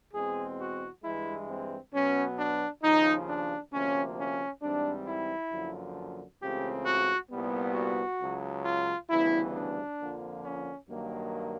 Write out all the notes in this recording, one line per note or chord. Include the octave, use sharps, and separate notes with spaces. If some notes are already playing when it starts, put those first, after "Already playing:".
E2 B2 G#3 C4 G#4
F#4
G2 E3 G#3 E4
C4
B2 F#3 B3 C#4
D4
D#2 C#3 F3 D#4
D4
D2 C3 F3 A#3 C#4
C#4
G#2 E3 G3 C4 D4
E4
F#2 D3 F3 A#3
C#2 C#3 E3 A3 C4 G4
F#4
C2 A#2 G3 B3
F#4
C#2 C#3 F#3
F4
D2 C#3 E3 G3 B3 E4
D4
F2 D3 F3 A#3
C#4
G2 D#3 F#3 A#3